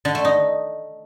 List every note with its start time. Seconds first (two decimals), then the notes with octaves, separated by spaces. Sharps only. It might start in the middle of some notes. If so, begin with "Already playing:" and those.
0.05 D3
0.15 A3
0.25 D#4